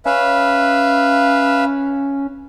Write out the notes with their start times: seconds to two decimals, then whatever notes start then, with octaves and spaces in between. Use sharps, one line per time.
0.06 C#4 B4 E5 F5